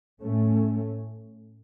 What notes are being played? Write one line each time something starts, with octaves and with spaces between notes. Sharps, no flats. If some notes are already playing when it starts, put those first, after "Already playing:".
A2 A3 C#4